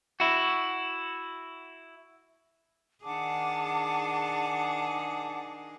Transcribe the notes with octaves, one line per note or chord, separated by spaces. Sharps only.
E4 F#4
D#3 D4 G#4 F#5 A5 D6